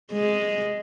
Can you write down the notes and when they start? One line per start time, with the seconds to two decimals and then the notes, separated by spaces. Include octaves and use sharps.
0.12 G#3